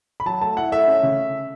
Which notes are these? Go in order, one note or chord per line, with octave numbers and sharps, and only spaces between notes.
B5
F#3 A5
A3 A5
E4 F#5
A3 E5
C#4
C#3